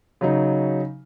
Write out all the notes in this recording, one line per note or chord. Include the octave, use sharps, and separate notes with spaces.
C#3 F#3 D#4